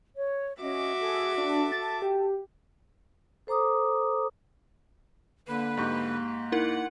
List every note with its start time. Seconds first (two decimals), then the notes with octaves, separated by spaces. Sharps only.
0.16 C#5
0.61 C#4 F#4 D#5 E5 D6
1.00 G#4 A4
1.37 D4 A4 A5
1.72 A6
2.02 G4
3.47 A4 C5 A#5 D6 D#6
5.48 D3 A#3 B4
5.77 G#2 G4 C#6
6.52 D#4 E4 A#4 F#5